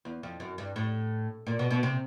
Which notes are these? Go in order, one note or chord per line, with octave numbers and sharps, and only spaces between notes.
E2
F2
F#2
G2
A2
A#2
B2
B2
C3